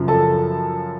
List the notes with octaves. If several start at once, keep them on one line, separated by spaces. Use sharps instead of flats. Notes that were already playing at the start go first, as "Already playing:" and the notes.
Already playing: F#2 C#3 F3
A4 A5